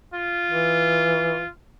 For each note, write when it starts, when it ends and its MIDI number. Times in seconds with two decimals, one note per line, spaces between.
0.14 1.49 65
0.51 1.41 52